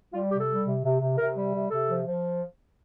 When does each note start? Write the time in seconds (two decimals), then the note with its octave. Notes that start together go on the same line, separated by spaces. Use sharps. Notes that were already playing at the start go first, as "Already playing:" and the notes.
0.13 G3 F4
0.31 C3 G4
0.39 A4
0.48 G3
0.66 C3
0.83 C3
1.01 C3
1.18 C3 A#4
1.36 G3
1.53 C3
1.70 C3 A4
1.88 F3
2.06 F3